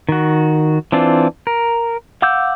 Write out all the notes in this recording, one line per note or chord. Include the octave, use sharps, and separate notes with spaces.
D#3 F#4
E3 C4 D4 F4
A#4
F5 F#5 D6 E6 G6